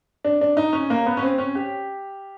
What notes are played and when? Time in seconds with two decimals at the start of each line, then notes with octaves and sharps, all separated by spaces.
0.24 D4
0.41 D4
0.57 D#4
0.73 C#4
0.90 A#3
1.06 B3
1.17 C#4
1.22 C4
1.38 C#4
1.55 G4